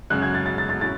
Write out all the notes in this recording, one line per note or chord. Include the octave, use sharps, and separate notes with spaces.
F#2 C#3 G#3 F#6
G#6
A6
A6
A6
A6
C#4 E4 A6